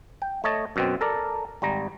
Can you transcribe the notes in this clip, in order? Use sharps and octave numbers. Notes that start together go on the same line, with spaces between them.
G5
A3 C#5 D#5 A5
F#2 B2 C4
A4 A#4 D5
G#1 G3 A#5